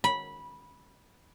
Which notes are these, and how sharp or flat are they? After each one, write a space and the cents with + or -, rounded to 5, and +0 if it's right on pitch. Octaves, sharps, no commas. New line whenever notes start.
B5 -15